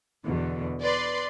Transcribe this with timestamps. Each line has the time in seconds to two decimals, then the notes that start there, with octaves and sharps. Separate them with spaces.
0.23 E2 B2 D3
0.84 B4 D5 C6